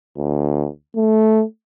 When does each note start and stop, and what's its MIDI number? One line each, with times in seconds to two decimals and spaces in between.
0.17 0.67 38
0.96 1.44 57